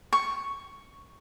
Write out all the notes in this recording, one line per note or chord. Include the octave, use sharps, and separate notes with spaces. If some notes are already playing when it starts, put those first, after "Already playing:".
C#6